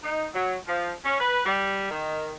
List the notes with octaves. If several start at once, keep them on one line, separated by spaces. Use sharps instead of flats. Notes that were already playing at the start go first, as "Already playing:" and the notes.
D#4
F#3
F3
C#4
B4
G3
D#3